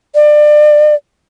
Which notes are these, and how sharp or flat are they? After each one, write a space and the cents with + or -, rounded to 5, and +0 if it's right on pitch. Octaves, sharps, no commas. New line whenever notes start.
D5 +25